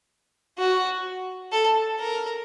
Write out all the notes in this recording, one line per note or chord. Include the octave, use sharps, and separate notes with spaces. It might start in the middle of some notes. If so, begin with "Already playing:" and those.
F#4
A4
A#4